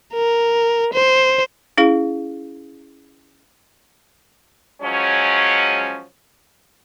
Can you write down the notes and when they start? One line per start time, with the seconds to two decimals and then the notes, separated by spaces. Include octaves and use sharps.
0.13 A#4
0.93 C5
1.77 C#4 E4 G#4 F5
4.81 F3 F#3 G#3 C#4